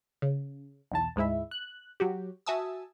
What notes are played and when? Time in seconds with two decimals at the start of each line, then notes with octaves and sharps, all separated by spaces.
0.22 C#3
0.92 B1 E2 A5
1.16 D2 G#2 G#3 E4 E5
1.51 F#6
2.00 F#3 F#4 G4
2.46 F#4 E5 G#5 A5 D#6 E6